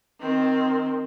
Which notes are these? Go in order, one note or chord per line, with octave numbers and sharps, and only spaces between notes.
D#3 C4